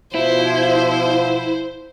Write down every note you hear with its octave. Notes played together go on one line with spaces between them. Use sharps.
B2 F3 E4 C5